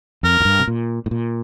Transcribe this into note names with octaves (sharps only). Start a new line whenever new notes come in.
F2 A#4
F2
G2
C3
A#2
A2
A#2